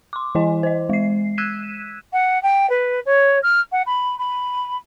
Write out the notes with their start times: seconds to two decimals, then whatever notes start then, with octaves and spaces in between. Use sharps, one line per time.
0.13 C6 D6
0.35 E3 E4 D#5 G#5
0.63 C5 D#5
0.89 G#3 C7
1.38 E6 F#6 G#6 B6 D#7 E7
2.13 F#5
2.43 G5
2.70 B4
3.06 C#5
3.43 F6
3.72 F#5
3.87 B5
4.19 B5